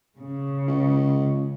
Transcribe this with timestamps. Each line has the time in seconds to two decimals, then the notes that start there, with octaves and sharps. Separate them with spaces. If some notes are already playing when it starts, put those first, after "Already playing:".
0.17 C#3
0.67 C#2